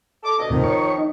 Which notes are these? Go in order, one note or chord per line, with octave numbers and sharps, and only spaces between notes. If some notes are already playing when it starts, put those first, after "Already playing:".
A4 D6
D2 B2 D#5
D#2 A2 C3 D#3 F3
C#5 C#6
D#4